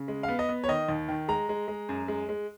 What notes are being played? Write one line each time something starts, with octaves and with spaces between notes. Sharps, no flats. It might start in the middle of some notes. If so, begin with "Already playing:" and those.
Already playing: C#3
G#3
F5
B3
D#5
B3
C#5
D#3 D#5
D#2
D#3
G#3 A#5
G#3
G#3
F#2
G#3
G#3